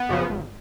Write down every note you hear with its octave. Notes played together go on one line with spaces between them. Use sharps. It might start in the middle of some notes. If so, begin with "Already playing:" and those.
Already playing: B3
F#2 C#3 F3
G#1